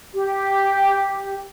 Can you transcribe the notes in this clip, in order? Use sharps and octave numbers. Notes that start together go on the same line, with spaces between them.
G4